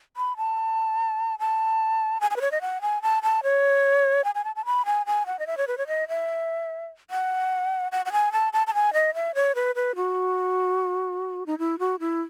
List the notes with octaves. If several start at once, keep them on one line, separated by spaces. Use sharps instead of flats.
B5
A5
A5
G#5
G#5
B4
C#5
D#5
F#5
G#5
A5
A5
C#5
G#5
G#5
A5
A5
B5
G#5
G#5
F#5
D#5
E5
C#5
B4
C#5
D#5
E5
F#5
F#5
F#5
G#5
A5
A5
A5
G#5
D#5
E5
C#5
B4
B4
F#4
D#4
E4
F#4
E4